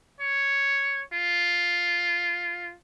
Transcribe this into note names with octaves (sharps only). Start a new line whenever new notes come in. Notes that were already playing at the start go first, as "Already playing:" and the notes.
C#5
F4